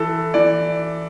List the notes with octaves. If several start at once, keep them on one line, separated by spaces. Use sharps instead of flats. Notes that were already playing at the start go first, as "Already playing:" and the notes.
Already playing: E3 A4
E3 D5